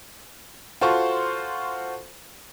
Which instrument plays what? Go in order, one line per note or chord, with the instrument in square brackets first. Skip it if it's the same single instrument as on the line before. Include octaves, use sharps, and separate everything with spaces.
[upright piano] F4 F#4 A4 C5 C6 C#6